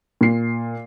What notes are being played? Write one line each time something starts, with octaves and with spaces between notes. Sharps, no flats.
A#2 C7